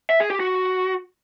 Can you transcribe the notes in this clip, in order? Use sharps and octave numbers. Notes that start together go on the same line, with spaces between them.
E5
G#4
G4
F#4